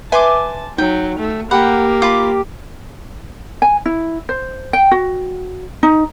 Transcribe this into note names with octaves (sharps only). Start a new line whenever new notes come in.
B4 E5 G#5 A5 C6 D6
F#3 D#4 G5
A3
A#3 G4 F#5 G5 B5
F4 B5 D6
G#5
E4
C5
G5
F#4
D#4